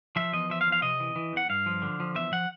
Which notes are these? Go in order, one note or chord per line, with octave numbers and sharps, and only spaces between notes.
F3 E5
E2 D#5
F3 E5
F5
E2
F5
C3 D#5
E3
E3
E2 F#5
G2 F5
F3
D3
F3
E2 E5
F3 F#5